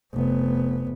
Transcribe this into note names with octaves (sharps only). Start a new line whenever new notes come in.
F1 B3